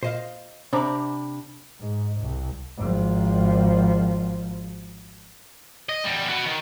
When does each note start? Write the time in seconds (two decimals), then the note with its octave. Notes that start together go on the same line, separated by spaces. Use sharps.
0.03 A#2 C5 D#5 F5
0.73 C3 D4 C5 A#5 B5 D6
1.81 G#2
2.22 C2
2.78 G#1 F3
5.89 D#5
6.05 E2 G3
6.29 B3 F#4
6.46 D#3